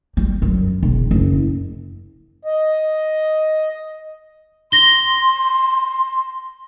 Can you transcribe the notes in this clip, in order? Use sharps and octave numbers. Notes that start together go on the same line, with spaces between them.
G3
F#2
E1
F#1
D#5
C6 A#6 G7